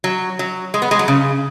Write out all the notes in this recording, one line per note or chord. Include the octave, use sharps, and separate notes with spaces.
F#3
F#3
G#3
B3
G#3
F#3
C#3